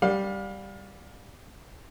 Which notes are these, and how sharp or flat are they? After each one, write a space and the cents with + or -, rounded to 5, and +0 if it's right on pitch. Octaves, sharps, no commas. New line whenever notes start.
G3 +0 F5 +30